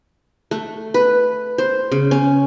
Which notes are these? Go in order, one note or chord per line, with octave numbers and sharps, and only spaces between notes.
A3
B4
C5
C#3
C#4